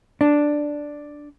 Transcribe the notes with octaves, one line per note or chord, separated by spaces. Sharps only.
D4